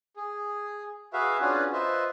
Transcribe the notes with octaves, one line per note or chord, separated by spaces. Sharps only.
G#4
F#4 G#4 B4 E5 F5
C#4 D4 F4 F#4 G#4 B4
F4 B4 C5 D#5 E5